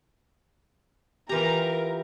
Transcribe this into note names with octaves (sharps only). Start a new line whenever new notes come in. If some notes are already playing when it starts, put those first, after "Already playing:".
E3 F4 G4 A#4 A#5